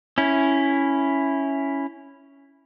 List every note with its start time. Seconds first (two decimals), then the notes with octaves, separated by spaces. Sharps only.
0.18 C#4 E4